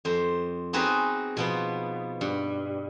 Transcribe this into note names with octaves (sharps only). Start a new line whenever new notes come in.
F2 C5
B3 C4 D#4 F#4 G#4 B4
B2 F3 B3
G2